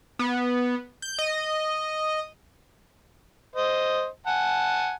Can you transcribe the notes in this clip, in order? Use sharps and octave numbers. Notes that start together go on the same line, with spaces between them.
B3
G6
D#5
C5 D#5
F#5 G#5 A5